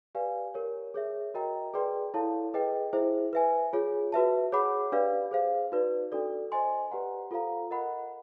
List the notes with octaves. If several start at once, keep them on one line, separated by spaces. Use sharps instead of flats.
G4 B4 D5 F5 G#5
G4 A#4 C#5
G#4 C#5 E5
F#4 A#4 D#5 G5 A#5
G#4 B4 D5 G5 C6
E4 A4 C#5 F5 A5
G#4 B4 D#5 G5
E4 G#4 C5 E5
B4 E5 G#5
F4 G#4 C#5
F#4 B4 E5 A5
G#4 C#5 F#5 B5 D6
D4 G4 B4 D5 F5
G#4 C5 F5
D#4 F#4 B4 D5
D4 F#4 A4 D5
C5 D#5 G#5 C6
G4 B4 D5 F#5 A#5
F4 A4 C5 F5 A#5
A#4 D#5 F#5 B5